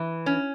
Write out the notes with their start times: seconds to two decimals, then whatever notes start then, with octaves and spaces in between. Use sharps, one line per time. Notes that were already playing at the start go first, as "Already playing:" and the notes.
Already playing: E3
0.26 C#4